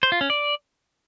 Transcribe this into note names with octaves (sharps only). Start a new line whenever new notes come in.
C5
F4
C#4
D5